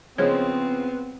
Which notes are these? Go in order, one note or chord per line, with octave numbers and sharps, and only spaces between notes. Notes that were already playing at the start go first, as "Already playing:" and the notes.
C#3 F3 G#3 B3 C4 C#5